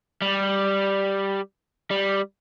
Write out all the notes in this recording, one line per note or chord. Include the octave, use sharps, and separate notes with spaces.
G3
G3